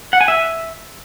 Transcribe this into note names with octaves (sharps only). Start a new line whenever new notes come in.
F#5
G#5
E5